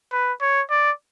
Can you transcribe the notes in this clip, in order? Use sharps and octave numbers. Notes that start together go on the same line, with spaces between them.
B4
C#5
D5